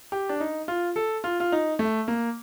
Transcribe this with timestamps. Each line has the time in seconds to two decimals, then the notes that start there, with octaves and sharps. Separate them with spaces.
0.12 G4
0.29 D4
0.40 D#4
0.68 F4
0.96 A4
1.24 F4
1.40 F4
1.52 D#4
1.79 A3
2.08 A#3